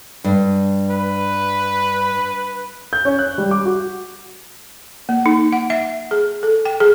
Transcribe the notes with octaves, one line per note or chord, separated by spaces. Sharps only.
G2
B4
G6
C#4
F#6
G3
D6
F#4
A#3
D#4
F#5
E5
G#4
A4
G5
G#4